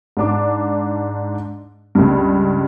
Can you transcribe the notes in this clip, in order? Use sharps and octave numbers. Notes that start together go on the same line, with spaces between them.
G#2 D4 D6
C#2 G2